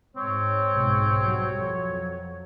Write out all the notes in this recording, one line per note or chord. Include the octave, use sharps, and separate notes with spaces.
G#2 C4 C#5
B1 G#2
F#3 G3
F2 F#3